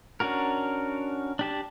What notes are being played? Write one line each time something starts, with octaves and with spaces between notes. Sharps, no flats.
C#4 D4 F#4 A#4
D4 G4 A5